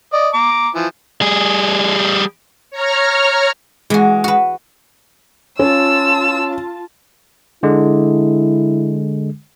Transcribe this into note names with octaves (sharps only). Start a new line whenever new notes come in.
D5 D#5
A#5 D6
E3 F3
G3 G#4
C#5 A#5 F6
E3 G#3 F#4
F#4 B4
C#4 F4 A5 E6
D3 G#3 E4